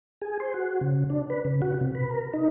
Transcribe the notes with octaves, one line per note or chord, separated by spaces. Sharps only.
G#4
C5
F#4
C#3
D4
B4
C#3
F#4
C3
B4
A#4
D#4